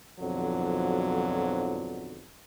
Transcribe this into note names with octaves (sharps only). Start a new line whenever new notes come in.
B1 F2 G#2 D3 F3 F#3